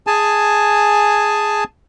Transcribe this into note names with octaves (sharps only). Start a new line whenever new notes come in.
G#4 G#5 A5